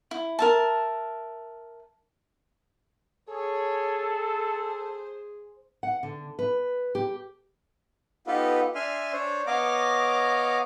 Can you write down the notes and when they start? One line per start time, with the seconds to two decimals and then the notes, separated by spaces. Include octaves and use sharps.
0.11 E4
0.39 A#4 E5 A5
3.29 G#4 A4 C#5
4.10 C5
5.83 F#5
6.03 D3
6.39 B4
6.95 G4
8.27 B3 D#4 F4 G4 A4 B4
8.75 D4 E5 G#5 C6 F6
9.13 D4 C5 C#5
9.47 B3 C#5 D#5 F5 A#5 D6